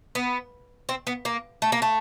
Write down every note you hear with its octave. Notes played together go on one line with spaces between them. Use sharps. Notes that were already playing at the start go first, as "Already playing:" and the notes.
B3
C4
B3
A#3
A3
A#3
A3